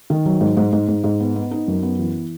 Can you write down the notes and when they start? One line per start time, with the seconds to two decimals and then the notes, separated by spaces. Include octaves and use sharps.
0.10 D#3
0.26 F#3
0.41 G#2
0.57 G#2
0.73 G#2
0.88 G#2
1.04 G#2
1.20 B3
1.36 B3
1.51 D#4
1.68 F#2
1.83 B3
1.99 E3